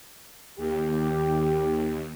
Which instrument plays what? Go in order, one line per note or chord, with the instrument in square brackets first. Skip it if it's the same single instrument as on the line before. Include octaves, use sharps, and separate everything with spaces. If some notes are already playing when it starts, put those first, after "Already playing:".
[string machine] D#2 [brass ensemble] G4